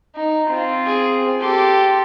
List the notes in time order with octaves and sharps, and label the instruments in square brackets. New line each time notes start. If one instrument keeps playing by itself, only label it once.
[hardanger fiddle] D#4
C4 F4
[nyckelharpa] G#4
[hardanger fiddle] G4 A4 [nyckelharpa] C6 D6